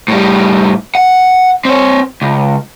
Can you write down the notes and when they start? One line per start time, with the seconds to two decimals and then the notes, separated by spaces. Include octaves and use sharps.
0.08 A2 G3
0.95 F#5
1.65 C4 C#5
2.21 C#2